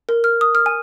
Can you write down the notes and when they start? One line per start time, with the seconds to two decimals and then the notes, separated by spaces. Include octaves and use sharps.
0.09 A#4
0.24 F6
0.41 D#6
0.55 F6
0.66 G#5